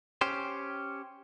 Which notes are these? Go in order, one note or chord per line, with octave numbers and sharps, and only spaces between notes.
C#4 G4 C5